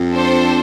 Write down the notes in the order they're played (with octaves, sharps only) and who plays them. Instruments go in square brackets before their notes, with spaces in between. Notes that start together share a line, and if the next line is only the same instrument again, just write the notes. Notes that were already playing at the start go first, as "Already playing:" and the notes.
Already playing: [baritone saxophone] F2
[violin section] D4 A4 C5